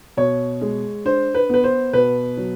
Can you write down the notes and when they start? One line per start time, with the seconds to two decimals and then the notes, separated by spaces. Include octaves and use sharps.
0.17 B2 C#5
0.61 G#3
1.05 D4 C5
1.34 B4
1.50 B3 B4
1.64 C5
1.93 B2 B4
2.37 F#3